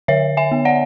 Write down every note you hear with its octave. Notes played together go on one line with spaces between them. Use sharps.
D3 C#5 E5
E5 G#5
B3
D5 F#5